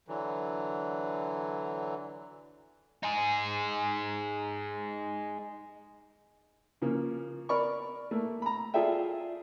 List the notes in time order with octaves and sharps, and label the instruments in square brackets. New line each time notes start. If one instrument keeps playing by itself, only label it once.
[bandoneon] D3 E3 F#3
[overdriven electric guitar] D#4 G#4
[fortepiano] C#3 F3 A#3
A#4 D5 B5 C#6
A3 A#3
A#5 B5
F4 G#4 A4 D5 E5 G5